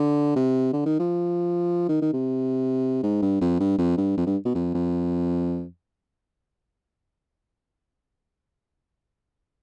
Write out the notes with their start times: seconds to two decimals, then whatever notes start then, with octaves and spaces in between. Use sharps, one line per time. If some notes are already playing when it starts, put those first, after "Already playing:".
Already playing: D3
0.36 C3
0.73 D3
0.86 D#3
1.00 F3
1.89 D#3
2.02 D#3
2.13 C3
3.03 G#2
3.22 G2
3.41 F2
3.60 G2
3.79 F2
3.98 G2
4.18 F2
4.27 G2
4.45 B2
4.55 F2
4.74 F2